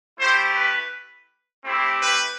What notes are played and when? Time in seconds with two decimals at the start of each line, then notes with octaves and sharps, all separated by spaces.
0.19 A3 E4 G4 C5
0.56 B4
1.64 A3 C4 E4 G4
2.01 B4